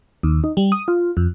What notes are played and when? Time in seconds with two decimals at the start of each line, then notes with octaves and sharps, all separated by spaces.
0.23 D#2
0.44 D#4
0.57 G3
0.72 D#6
0.88 F4
1.17 F2